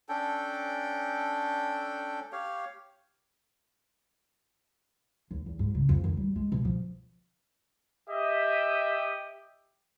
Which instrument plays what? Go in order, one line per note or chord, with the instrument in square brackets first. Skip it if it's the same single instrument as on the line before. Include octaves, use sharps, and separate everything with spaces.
[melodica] C#4 D4 A4 G5
G4 C#5 F5
[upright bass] D#2
E2
G#2
C#3
F2
D#3
G3
G#3
B2
F3
[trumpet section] G4 D#5 E5